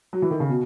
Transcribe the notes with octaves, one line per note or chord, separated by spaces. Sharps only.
F#3
E3
D#3
C#3
B2